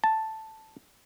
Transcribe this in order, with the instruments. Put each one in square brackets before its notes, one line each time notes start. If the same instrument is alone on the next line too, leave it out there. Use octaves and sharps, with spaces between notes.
[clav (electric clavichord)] A5